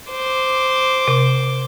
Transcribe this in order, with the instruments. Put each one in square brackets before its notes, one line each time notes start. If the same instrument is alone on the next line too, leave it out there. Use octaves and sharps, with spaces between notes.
[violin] C5 D6
[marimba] C3